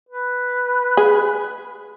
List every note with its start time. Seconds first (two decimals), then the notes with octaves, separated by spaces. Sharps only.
0.09 B4
0.97 G#4